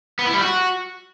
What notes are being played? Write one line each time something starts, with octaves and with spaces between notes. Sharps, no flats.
B3
E4
G3
F#4